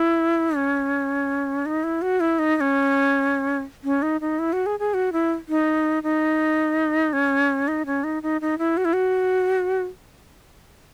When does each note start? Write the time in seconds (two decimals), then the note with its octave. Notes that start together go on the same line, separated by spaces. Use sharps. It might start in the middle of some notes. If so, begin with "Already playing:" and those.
Already playing: E4
0.56 C#4
1.66 D#4
1.84 E4
2.02 F#4
2.20 E4
2.39 D#4
2.57 D#4
2.61 C#4
3.84 C#4
4.02 D#4
4.21 D#4
4.39 E4
4.53 F#4
4.66 G#4
4.79 G#4
4.94 F#4
5.13 E4
5.49 D#4
6.03 D#4
7.13 C#4
7.68 D#4
7.86 C#4
8.04 D#4
8.23 D#4
8.41 D#4
8.58 E4
8.77 F#4
8.85 E4
8.93 F#4